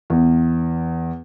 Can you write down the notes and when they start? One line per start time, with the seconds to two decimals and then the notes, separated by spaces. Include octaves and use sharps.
0.10 E2